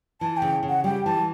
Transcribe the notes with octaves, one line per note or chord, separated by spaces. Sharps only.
E3 A5
C#3 G5
C#3
F#5
G3 G5
E3 A5